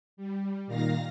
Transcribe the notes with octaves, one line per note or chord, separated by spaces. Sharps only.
G3
A#2 D#3 F5 A#6